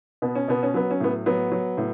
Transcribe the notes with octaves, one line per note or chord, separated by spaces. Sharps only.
B2 B3
C#4
B2 B3
C#4
F#3 B3
C#4
A2 B3
F#3 B3
F#3
A2